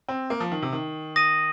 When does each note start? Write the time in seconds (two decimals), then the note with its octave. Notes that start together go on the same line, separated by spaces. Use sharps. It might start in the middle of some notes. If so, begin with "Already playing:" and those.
0.08 C4
0.30 A#3
0.40 F3
0.52 D#3
0.62 C3
0.73 D#3
1.16 D#6 A#6 D#7